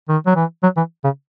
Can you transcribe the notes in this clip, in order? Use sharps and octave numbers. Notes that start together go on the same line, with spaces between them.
D#3
F#3
E3
F#3
E3
C#3